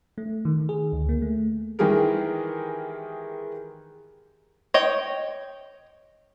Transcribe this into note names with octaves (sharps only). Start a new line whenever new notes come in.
A3
D#3
G#4
D2
A#3
A3
D#3 E3 G#3 G4 G#4 A#4
C#5 D#5 G5